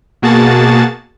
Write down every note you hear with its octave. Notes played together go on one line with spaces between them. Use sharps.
B2 A#3 F#4 G#4 A5 A6